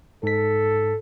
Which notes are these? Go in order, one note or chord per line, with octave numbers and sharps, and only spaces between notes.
G#2 A4 B6